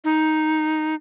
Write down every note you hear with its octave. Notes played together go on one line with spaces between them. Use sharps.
D#4